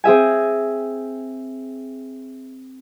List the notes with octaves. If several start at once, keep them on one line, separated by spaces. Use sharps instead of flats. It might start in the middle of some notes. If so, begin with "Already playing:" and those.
C4 G#4 E5 G#5